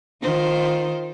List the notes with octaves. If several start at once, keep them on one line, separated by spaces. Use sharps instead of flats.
D#3 F4 C5